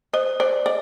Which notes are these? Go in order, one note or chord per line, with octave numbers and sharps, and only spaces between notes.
C5 D#5
C5 D5
D5 D#5